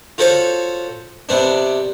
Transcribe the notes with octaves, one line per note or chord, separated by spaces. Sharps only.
F4 F#4 A4 C5 C#5
C3 B3 D4